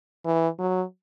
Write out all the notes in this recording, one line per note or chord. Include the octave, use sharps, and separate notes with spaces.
E3
F#3